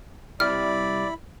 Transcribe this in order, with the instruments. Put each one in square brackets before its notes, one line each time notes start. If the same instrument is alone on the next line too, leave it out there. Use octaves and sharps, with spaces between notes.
[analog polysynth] C3 G3 [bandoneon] E4 B5 [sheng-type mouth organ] D5 [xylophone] F6